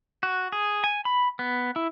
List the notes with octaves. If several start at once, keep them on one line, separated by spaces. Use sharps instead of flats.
F#4
G#4
G#5
B5
B3
E4